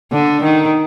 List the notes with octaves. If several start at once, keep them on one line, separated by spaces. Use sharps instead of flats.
D3
D#3